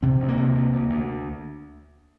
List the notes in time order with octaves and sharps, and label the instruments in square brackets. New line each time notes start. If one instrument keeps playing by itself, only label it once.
[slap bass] C3 C4
D2
A#3
C3
D2
D2
D2